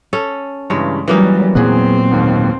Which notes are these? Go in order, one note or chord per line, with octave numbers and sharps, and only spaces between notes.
C#4 A4
G2 C#3 E3 G#3 C#5
E3 F#3 G3 A#3 C#4 D#4 A#4
E2 A#2 F#3 B3 C4 G#4 F#6
D#2 G#2 B2